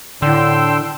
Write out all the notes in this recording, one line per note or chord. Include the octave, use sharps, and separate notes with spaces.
A2 D3 D4 G5 C6 E6